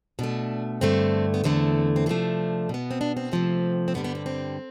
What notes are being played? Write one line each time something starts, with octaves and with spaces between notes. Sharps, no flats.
B2 A3 D4
G2 D3 A3 C4
B3
E2 D3 A3 C4
C4
C3 F3 A3 D4
B2 B3
C4
D4
C4
C3 F3 A3
C4
G2 D3 G3 B3
B3
C4
C4